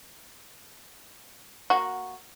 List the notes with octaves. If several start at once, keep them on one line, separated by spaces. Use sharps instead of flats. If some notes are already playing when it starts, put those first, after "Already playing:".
A#3 F#4